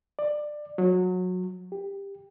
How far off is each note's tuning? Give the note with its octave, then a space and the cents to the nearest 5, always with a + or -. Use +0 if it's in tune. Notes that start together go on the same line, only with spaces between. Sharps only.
D5 +20
F#3 -20
G4 +15